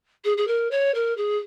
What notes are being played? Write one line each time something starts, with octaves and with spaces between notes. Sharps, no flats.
G#4
G#4
A#4
C#5
A#4
G#4